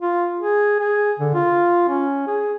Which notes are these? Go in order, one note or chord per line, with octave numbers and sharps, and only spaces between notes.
F4
G#4
G#4
D3
F4
C#4
G#4